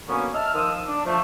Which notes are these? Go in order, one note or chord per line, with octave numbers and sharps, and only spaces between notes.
D3 F#3 A#3 B3 C#4
D#5 E5 A5 E6 F6
D#3 F3 D#6 E6
D4
F3 A3